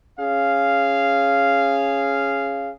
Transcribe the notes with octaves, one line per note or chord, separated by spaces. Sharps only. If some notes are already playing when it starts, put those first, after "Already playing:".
C#4 G#4 F5